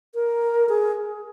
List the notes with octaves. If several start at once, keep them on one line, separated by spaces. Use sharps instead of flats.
A#4
G#4